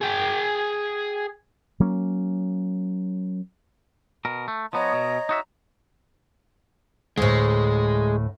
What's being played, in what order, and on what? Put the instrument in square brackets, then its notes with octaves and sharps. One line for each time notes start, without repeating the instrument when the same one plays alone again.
[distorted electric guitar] G#4 G5
[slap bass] F#3 A#3 C#4
[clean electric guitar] B2 A#4
A3
[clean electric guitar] F3 B3 [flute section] C#5 D#5 A#5
[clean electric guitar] B2
D#4 F#4 E5
[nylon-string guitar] D2 A2 [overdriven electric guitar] G#3